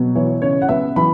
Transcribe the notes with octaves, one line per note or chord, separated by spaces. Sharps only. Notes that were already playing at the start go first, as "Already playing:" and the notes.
Already playing: B2 F#3
E3 C#5
C#3 C#5
F#5
B3 E5
E3 B5